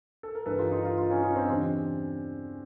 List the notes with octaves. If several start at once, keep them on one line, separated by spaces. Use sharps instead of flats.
A4
A#4
G2 E3 G3 A4 B4
D#4 F4
D#4 F4
D#4 F4
D#4 F4
C#4 D#4
D#4 F4
C4 D4
E2 C#3 E3 G3 C4 D4